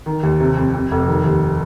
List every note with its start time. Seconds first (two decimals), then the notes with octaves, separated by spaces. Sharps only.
0.06 D#3
0.23 D#2
0.40 C3
0.57 F2
0.74 F2
0.91 F1
1.08 D#3
1.24 D#2